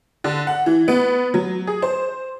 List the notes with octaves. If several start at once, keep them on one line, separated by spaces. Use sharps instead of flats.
D3
F#5
E3
B3
F#3
G#4
C5